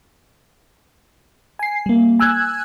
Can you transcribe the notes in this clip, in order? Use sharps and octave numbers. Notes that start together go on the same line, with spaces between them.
G#5 C7
G3 A#3
G#5 E6 F#6 G#6